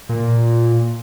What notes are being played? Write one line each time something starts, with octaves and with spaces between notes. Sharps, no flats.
A#2